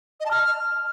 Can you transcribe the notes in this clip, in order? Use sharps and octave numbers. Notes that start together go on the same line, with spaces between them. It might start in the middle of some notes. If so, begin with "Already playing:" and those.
D#5
A5
F6